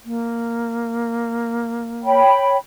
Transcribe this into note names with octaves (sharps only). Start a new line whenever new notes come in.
A#3
C#5 G5 B5